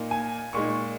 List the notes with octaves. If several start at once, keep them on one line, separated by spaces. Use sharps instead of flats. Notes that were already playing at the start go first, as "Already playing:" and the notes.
Already playing: A#2 A#3 D#4
G#5
A#2 G#3 D#4 C#6